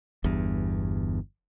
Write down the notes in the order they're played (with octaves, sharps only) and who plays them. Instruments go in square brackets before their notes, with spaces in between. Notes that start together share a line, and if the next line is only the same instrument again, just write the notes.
[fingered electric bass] G1 E2 G2